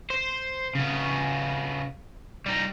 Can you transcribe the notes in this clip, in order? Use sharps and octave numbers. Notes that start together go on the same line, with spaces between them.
C5
C#3 B3
G3 D#4